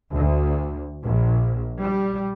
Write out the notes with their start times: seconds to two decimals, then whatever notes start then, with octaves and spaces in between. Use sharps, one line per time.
0.11 D2
1.04 A#1
1.79 G3